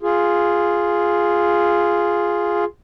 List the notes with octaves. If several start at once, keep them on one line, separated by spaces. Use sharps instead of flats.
F4 G#4